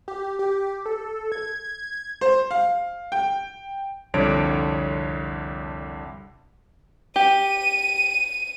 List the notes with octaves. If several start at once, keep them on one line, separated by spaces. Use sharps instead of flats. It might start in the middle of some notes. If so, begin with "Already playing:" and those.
G4
G4
A4
G#6
C5
F5
G5
C2 F2 D3 C#5 D7
G4 D#7